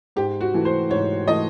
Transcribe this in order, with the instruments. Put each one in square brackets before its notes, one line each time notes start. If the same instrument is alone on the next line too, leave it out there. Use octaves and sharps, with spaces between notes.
[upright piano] G#2 G4
F#4
E3 A3
C5
G#2 C#5
E3 A3 D#5